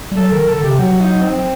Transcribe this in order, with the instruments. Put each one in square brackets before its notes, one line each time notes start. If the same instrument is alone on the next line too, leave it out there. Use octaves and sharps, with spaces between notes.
[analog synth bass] G3
[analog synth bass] F#3 [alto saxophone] A4
[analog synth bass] D#3 [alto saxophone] A#4
[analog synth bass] D3 [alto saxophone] A4
[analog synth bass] C3 [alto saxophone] G4
[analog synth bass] F#3 [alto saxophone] F#4
[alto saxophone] D#4
C4